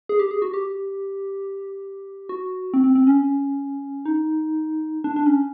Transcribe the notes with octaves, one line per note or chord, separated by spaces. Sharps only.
G#4
G4
G#4
F#4
G4
F#4
C4
C4
C4
C#4
D#4
D4
D4
C#4